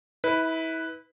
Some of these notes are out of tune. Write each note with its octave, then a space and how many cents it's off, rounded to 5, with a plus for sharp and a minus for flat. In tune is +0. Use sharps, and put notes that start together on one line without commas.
E4 -30 B4 +0